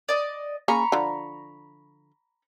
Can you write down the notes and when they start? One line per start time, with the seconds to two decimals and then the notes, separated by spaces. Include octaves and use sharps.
0.09 D5 D#5
0.68 A#3 C#4 G#4 A#5 B5 C#6
0.92 D3 F3